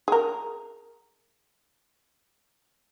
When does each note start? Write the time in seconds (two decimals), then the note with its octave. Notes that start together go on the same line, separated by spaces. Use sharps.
0.08 G#4 A#4